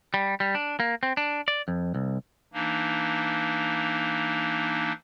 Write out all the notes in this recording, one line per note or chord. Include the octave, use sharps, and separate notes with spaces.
G3
G3
D4
A#3
C4
D4
D5
F2
C2
E3 A#3 D4 D#4